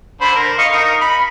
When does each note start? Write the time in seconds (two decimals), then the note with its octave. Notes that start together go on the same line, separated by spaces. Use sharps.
0.21 D3 C5 B5
0.36 A#4
0.58 D#5 F5 C#6
0.73 D#4 A#4
1.01 B5